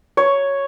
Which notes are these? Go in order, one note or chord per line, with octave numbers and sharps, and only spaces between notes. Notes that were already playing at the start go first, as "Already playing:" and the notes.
C#5